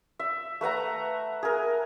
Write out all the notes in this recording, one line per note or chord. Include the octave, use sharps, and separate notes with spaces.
E5
A3 B4 F#5 A#5
G#4 A#4